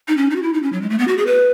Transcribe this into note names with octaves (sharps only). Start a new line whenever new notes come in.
D#4
C#4
D#4
F#4
E4
D#4
C#4
F#3
G#3
A3
B3
F#4
G#4
B4